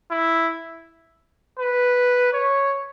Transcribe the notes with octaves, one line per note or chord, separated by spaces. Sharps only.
E4
B4
C#5